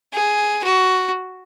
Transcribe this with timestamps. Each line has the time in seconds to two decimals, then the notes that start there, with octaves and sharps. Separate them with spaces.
0.13 G#4
0.64 F#4